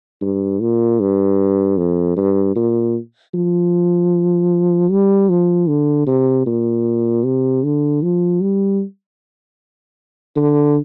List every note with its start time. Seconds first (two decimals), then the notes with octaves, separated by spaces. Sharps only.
0.22 G2
0.61 A#2
1.00 G2
1.77 F2
2.17 G2
2.56 A#2
3.34 F3
4.91 G3
5.29 F3
5.68 D3
6.07 C3
6.46 A#2
7.24 C3
7.64 D3
8.03 F3
8.41 G3
10.36 D3